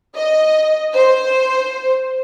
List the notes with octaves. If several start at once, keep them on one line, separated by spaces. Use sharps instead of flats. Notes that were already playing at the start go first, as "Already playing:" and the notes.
D#5
C5